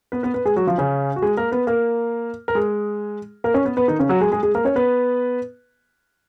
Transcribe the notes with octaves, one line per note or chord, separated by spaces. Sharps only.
B3 B4
B3 B4
B3 B4
G#3 G#4
F#3 F#4
F3 F4
C#3 C#4
F#4
G#3 G#4
A#3 A#4
B3 B4
A#3 A#4
A#4
G#3 G#4
A#3 A#4
C#4 C#5
B3 B4
B3 B4
D#3 D#4
C#3 C#4
F#3 F#4
G#3 G#4
G#3 G#4
G#3 G#4
A#3 A#4
C#4 C#5
B3 B4